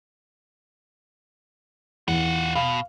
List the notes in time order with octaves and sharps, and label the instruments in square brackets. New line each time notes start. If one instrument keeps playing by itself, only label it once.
[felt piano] E2 [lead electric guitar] F4 F#5
[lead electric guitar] B2 [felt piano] F5